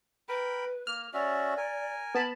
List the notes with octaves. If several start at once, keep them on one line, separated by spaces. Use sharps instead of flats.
A#4 B4 G5 B5
A#3 F6
C#4 F#4 D5 E5
A#4 G#5
B3 A5 B5